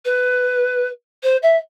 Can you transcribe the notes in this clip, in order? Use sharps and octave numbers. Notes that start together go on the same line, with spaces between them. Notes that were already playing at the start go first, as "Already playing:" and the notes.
B4
C5
E5